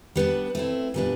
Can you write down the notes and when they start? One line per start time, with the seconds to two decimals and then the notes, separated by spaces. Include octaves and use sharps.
0.16 G3 B3 D4
0.55 A3 C4 E4
0.94 A#2 G3 B3 D4